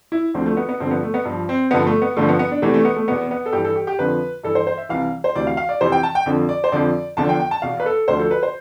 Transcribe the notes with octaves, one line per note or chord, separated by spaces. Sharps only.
E4
D2 D3 F3 C4
A3
B3
B3
G2 D3 F3 C4
B3
A3
B3
G2 F3
C4
G2 D3 F3 B3
A3
B3
G2 D3 F3 A3
B3
B3
D4
E2 C3 E3 A3
A3
B3
A3
E2 B2 B3
B3
A4
G2 E3 G4
A4
G4
G4
F2 D3 F3 B4
G2 E3 A4
C5
C5
E5
C2 C3 E3 F5
C5
D2 C3 E3 D5
F5
F5
D5
F2 C3 E3 C5
G5
A5
G5
F2 D3 F3
D5
C5
F2 D3 F3 D5
E2 D3 F3 A5
G5
G5
A5
E2 B2 F5
B4
A4
D2 D3 F3 C5
A4
B4
C5